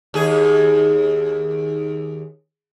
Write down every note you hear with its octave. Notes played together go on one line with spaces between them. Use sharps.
D#2 G#4